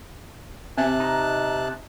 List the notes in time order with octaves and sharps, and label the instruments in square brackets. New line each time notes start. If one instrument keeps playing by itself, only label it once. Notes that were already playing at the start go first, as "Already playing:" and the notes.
[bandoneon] C3 A5 F#6 [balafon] C4 E5
[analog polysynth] D#4